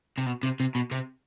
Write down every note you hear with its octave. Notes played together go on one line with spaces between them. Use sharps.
C3
B2
C3
C3
B2
C3